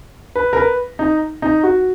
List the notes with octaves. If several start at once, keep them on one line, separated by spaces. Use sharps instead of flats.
B4
A#4
B4
D#4
D#4
F#4